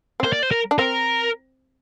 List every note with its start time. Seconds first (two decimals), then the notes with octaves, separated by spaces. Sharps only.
0.20 C4
0.24 A#3 C5
0.33 D5
0.43 C5
0.51 A#4
0.71 D4
0.79 C4 A#4